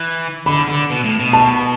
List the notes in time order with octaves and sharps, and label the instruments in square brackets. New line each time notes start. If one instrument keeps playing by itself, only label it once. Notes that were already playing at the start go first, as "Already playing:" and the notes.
Already playing: [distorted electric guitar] E3
[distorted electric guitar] D3 [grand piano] B5
[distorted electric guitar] D3
B2
A2
B2
[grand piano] A5